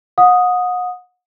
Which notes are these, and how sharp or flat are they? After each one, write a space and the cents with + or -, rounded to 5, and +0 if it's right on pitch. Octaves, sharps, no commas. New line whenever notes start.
F#5 -35 D#6 +0